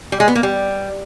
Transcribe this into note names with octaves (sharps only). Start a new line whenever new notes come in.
G3
G#3
B3
A#3
G3